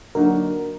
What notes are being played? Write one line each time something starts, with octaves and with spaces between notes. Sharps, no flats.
D3 F#3 A#3 D#4 F#4 A#4